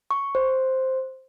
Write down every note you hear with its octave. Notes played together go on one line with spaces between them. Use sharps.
C#6
C5